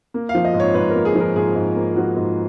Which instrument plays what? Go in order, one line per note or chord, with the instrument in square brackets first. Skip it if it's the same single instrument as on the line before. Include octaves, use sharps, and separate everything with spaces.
[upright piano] A#3
F5
F3
D#5
G#2
C#5
G#2 B4
A#4
A#3
G#4
F3 A#4
G#2 G#4
G#2
A#3
F3 F#4
G#2